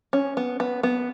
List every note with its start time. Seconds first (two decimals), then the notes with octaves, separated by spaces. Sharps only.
0.13 C#4
0.37 B3
0.60 B3
0.83 B3